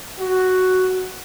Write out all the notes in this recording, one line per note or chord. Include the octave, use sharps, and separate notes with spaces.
F#4